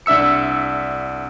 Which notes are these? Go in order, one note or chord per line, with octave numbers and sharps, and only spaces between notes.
C2 D4 E5 E6 C#7